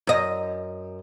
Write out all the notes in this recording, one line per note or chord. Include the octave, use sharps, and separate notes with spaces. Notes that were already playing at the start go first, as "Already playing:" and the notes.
F#2 D#5